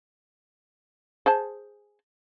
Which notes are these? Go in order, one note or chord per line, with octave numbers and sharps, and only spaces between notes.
G#4 C5 A5